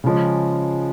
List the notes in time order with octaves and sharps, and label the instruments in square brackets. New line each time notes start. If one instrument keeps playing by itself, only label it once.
[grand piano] C#3 F3 G#3 C#4